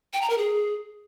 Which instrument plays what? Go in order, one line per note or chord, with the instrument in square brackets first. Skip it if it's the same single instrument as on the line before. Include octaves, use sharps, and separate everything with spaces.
[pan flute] G5
A#5
A#4
G#4